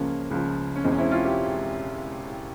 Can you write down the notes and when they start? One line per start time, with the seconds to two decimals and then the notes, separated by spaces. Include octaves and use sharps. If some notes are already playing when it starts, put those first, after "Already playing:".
Already playing: C#2 C#3 F3 A#3 C#4
0.31 C#2 C#3 F3
0.75 C#4
0.84 E1 E2 C#3 G#3 C4
0.92 C#4
0.98 C4 E4
1.11 C#4 F4
1.25 E4 G4